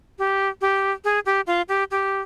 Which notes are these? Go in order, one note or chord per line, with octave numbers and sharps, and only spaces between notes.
G4
G4
G#4
G4
F4
G4
G4